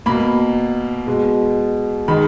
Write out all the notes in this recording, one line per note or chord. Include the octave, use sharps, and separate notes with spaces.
B2 A#3 B5
B2 G#3
D#3 G#3 B5